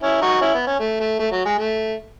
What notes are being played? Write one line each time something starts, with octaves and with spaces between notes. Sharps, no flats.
C#4 E4
D#4 F#4
C#4 E4
B3
C#4
A3
A3
A3
F#3
G#3
A3